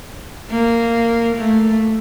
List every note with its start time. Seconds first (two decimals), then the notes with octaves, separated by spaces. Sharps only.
0.50 A#3
1.35 A3